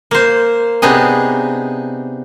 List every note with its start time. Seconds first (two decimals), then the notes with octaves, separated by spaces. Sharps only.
0.11 A#3 C5
0.82 C3 B3 D4 D#4 G#4